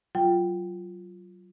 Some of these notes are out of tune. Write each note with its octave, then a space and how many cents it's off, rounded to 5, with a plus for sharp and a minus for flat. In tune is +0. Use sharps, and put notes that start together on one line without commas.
F#3 +20 F4 +0 G5 +0